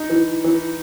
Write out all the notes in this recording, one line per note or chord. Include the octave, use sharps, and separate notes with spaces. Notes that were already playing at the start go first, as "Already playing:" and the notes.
Already playing: D#4
E3
E3